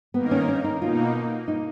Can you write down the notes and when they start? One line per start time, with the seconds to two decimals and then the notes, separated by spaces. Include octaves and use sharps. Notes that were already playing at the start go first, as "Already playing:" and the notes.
0.14 D#3 A#3 B3 D#4 A#4
0.31 C#4
0.48 C#4
0.64 D#4
0.81 B2 A#3 D#4 F4
1.48 D#4